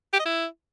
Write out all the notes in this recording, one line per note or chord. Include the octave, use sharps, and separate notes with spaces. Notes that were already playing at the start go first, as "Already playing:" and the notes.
G4
D#5
E4